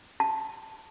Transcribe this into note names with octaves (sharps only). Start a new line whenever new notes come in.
A5